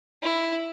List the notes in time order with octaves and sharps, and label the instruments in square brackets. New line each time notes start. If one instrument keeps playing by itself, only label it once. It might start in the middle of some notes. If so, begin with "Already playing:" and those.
[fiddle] E4